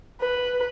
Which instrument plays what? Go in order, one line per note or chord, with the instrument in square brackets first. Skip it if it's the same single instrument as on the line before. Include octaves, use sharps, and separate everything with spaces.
[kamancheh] B4